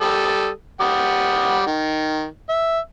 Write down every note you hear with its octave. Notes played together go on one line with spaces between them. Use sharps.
G3 A4 D#6
G3 F#5 D#6
D#3
E5